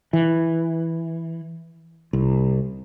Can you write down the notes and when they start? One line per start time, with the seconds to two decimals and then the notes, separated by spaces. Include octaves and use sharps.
0.13 E3
2.13 C2